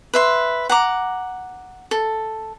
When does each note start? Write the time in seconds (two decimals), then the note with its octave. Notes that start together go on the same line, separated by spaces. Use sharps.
0.14 B4 E5 C6
0.69 F#5 A#5 D6
1.91 A4